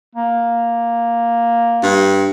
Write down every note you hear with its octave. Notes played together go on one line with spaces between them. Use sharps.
A#3
G2